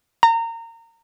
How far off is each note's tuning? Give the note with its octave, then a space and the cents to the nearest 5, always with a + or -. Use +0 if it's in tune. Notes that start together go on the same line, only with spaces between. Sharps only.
A#5 -25